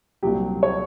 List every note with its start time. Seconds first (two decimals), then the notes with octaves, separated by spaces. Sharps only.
0.23 C2 A#2 F#3 G4
0.63 C#5